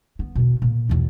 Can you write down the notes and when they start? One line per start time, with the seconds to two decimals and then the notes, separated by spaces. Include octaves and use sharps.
0.19 B3
0.35 E2 B2
0.62 A#2
0.89 B1 E2